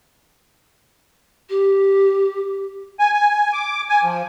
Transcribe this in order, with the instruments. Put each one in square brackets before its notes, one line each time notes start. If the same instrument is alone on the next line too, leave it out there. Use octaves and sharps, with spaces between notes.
[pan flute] G4
[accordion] G#5
G#5
D6
G#5
F3